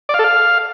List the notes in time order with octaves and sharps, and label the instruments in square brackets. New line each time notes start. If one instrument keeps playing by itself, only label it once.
[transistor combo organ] D5
F5
A4
F5